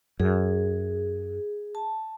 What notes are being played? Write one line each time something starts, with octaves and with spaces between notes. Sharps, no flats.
F#2 G#4
A5